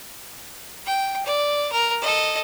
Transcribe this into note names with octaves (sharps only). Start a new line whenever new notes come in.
G5
D5
A#4
A4 D#5